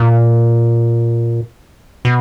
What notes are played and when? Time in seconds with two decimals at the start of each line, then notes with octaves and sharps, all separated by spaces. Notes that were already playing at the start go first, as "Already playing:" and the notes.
Already playing: A#2
2.05 B2